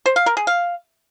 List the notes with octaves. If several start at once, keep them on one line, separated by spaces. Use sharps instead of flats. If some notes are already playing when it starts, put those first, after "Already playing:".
C5
F5
A#4
G#4
F5